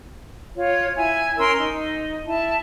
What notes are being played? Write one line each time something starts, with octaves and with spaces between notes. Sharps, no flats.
F4 C#5
E4 G#5
C#4 A#4 C6 E6
D#4
E4 A5